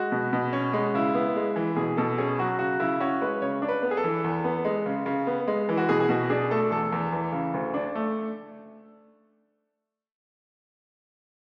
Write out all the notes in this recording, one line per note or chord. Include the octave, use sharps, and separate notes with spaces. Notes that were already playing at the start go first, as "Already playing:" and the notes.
Already playing: G#3 F#4
B2
B2
C#4
G#3
C#3 E4
B3
G#3
E3
B2 G#4
B2 A4
C#4 G#4
F#3 F#4
C#3 F#4
C#3 E4
C#4 F#4
G#3 B4
C#3 C#5
D4
B4
B3
G#4
A4
E3
E2
B3
G#3
C#3
C#3
B3
G#3
E3
F#4
B2 G#4
G#4
B2 F#4
D4 G#4
A3 A4
E2 A4
E2
E3
C#3
D2
D4
A3